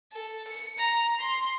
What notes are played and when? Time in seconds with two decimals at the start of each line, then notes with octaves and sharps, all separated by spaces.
0.13 A4
0.48 C#7
0.78 A#5
1.20 C6